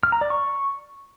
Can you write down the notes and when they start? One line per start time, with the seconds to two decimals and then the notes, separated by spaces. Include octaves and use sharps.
0.03 F6
0.12 A#5
0.21 D5
0.30 C#6